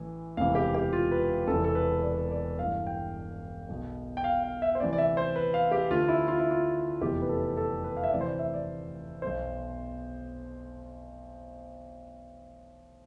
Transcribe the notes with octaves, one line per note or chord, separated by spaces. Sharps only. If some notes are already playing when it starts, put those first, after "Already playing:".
Already playing: A1 A2 E3
E1 D2 C3 E3 F5
G4
G4
F4
B4
E1 E2 C3 E3 A4
A4
B4
D5
D5
A1 G2 E3 F5
G5
B1 B2
G5
F5
F5
E5
C5
D2 C3 E3 D5
D5
E5
C5
B4
F5
G4
D2 D3 F4
E4
F4
E4
F4
F1 E2 C3 E3 G4
B4
A4
A4
B4
F5
E5
D2 C3 E3 D5
C5
D5
E5
D5
B1 B2 C5